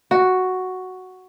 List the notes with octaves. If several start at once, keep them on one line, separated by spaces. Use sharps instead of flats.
F#4